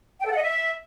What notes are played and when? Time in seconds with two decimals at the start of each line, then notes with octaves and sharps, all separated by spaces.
0.19 G5
0.25 A4
0.31 F#5
0.36 D#5
0.42 E5